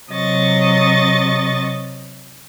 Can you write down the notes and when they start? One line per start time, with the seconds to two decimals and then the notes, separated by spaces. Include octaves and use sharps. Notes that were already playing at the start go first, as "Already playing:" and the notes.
0.10 C3 F#3 D#5 C#6 A6